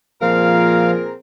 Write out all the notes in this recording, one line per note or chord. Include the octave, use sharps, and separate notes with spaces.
A#2 F3 C4 G#4 A#4 F5